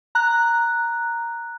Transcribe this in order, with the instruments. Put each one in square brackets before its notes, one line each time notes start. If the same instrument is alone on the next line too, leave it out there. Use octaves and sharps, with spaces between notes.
[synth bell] A#5 F#6